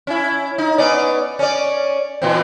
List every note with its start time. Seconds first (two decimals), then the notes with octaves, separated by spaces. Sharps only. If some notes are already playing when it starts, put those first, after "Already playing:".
0.07 C#4 E4
0.58 D#4
0.78 B3 C#4 D5
1.39 C#4 D5
2.22 A#2 E3 C4